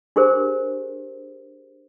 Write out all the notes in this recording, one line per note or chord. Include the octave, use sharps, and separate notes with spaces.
D4 G4 G#4 A#4 C5